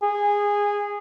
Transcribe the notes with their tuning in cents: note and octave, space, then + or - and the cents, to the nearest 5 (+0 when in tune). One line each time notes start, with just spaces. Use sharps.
G#4 -15